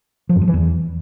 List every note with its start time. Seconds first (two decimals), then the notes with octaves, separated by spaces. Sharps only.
0.29 F3
0.36 F#2
0.42 G2
0.48 E3
0.54 E2